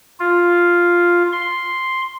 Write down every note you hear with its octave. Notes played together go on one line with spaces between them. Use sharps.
F4
C6